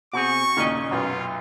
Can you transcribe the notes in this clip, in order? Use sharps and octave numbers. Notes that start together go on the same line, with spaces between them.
B2 C4 F#4 G#4 C#6
D#2 A#2 C#3 C#4 D#5
B1 F#2 F#3 F4